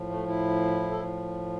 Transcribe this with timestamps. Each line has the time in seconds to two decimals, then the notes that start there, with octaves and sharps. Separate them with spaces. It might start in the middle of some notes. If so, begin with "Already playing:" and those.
Already playing: A2 F3
0.09 A3
0.27 E4
0.91 A4